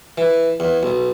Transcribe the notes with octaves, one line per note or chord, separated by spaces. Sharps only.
E3
E2
B1